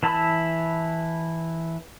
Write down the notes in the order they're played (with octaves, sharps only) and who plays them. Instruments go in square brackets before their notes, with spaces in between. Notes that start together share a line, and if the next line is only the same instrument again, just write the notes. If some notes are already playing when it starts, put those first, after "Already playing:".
[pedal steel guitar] E3 E4 A5 B5 E6